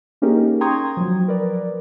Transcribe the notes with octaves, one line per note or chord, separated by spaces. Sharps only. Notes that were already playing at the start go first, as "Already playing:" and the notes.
A#3 C#4 D#4 G4 G#4 A#4
G5 A#5 C6 C#6 D#6 G#6
F3 F#3
A#4 B4 D5